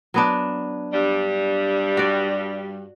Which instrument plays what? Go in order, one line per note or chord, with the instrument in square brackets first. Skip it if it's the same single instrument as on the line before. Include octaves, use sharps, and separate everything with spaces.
[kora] F#3 B3 D4
[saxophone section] G2 G3
[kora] F#4 D5